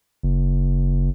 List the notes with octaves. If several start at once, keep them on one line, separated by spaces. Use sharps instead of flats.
F#1